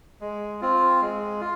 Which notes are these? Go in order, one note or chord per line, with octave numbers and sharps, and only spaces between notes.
G#3
C4 F4
G#3
F4